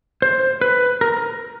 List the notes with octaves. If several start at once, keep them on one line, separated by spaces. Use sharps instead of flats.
C5
B4
A#4